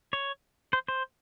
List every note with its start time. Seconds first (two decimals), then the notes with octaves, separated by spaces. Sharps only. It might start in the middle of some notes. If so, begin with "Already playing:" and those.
0.13 C#5
0.73 C5
0.88 C5